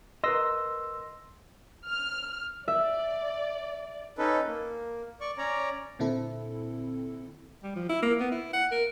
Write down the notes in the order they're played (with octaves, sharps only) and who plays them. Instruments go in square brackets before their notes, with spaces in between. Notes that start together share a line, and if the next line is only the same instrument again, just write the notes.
[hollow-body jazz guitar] A#4 B4 D#5 [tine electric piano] C6 E6 A#6
[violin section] F6
[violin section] D5 [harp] E5
[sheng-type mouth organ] C#4 D#4 A4 B4
A#3
D5 C#6
C#4 C#5 D5 A#5
[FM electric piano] A#2 D3 C4 E4 A4
[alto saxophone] G3
F3
E4
A#3
B3
E4
F#5
A#4